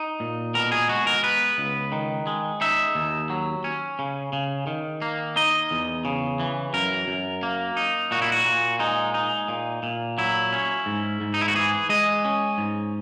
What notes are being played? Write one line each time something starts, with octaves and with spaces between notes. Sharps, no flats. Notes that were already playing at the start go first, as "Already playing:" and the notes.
Already playing: D#4
A#2
B2 A#4
G#4
G#3 F#4
A#4
B3 B4
C#2
D#3
G#3
D#4 E5
D#2
F#3
C#4
C#3
C#3
D#3
A#3
D#4 D#5
E2
C#3
E3
F#2 A#4
F#2
A#3
D#4
A#2 F#4
E4
F#4
A#2
G#3 D#4
D#4
A#2
A#2
F#3 E4
C#4
G#2
G#2
D#4
E4
F#4
E3 G#4
G#3 D#5
C#4
G#2